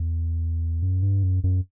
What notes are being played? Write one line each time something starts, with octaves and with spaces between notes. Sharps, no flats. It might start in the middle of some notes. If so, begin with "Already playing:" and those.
Already playing: E2
F#2
G2
F#2
F#2